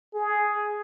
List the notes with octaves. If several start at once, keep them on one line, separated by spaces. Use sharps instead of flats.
G#4